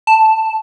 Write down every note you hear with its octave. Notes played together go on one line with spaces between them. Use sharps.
A5